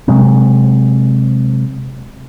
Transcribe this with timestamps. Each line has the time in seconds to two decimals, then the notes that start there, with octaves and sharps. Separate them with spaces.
0.08 C3 F#3 G#3 C4